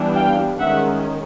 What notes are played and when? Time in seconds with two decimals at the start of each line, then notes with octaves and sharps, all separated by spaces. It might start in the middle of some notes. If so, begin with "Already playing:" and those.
Already playing: E3 G3 B3 D4
0.16 F5 G5
0.58 D#3 G#3 C#4 E5 F#5